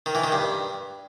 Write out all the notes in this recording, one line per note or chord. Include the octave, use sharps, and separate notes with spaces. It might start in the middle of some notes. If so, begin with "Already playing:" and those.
D#3
E3
D#3
G2